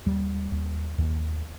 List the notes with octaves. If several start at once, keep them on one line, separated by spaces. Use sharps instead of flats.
D#2 G3
D#2
D#2